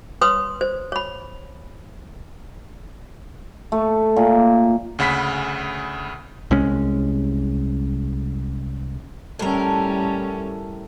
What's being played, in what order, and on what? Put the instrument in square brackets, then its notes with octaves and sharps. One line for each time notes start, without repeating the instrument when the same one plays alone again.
[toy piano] B4 C#5 C6 D#6
C5
C#5 B5
[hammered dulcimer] A3
A#2
[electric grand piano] D2 C#3 F#5 B5 B6
[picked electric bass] C2 G#3 C#4
[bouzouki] A2 A#4 [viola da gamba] G3 C#4